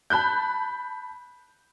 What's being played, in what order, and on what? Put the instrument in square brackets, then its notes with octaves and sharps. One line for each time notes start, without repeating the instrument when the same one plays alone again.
[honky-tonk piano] A5 B5 F#6 G6